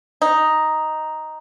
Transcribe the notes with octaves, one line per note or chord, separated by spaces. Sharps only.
D#4